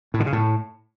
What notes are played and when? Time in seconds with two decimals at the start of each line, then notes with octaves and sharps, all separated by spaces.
0.14 A2
0.20 D3
0.26 C#3
0.33 A2